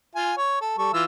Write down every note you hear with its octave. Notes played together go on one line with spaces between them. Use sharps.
F4 G#5
C#5
A4
G3 A4 C#6
E3 F4 E6